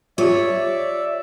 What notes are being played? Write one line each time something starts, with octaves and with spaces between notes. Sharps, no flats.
F4 G4 C#5 D5 E5